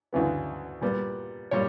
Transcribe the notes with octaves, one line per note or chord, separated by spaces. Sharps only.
D2 C#3 E3 B3
A#2 G3 B3
A#2 G3 C#5